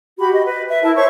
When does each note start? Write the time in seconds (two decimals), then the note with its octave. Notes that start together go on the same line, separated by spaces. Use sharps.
0.18 F#4 G4 B5
0.32 D#5
0.45 B4
0.68 B4 E5
0.82 E4 A#4 A5
0.95 C5 C#5 E5 C#6